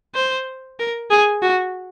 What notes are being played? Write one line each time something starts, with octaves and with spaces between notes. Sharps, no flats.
C5
A#4
G#4
F#4